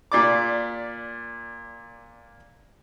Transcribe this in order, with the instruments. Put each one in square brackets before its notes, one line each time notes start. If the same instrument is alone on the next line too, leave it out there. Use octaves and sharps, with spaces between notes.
[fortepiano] A#2 D5 D6